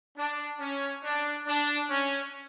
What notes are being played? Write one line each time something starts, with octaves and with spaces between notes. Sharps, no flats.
D4
C#4
D4
D4
C#4